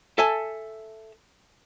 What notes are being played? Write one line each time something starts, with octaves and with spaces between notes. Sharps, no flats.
A4 E5 G#5 A5